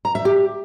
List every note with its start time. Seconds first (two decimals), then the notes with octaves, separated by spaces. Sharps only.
0.05 A#5
0.15 E5
0.25 G4